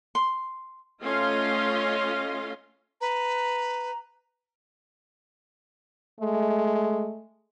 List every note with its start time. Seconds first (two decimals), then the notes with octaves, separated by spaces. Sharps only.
0.15 C6
1.03 A3 C#4 F4 D#5 F5 C6
3.01 B4 A#5
6.21 G#3 A3